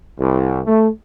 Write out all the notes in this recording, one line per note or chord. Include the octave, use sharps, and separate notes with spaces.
C2
A3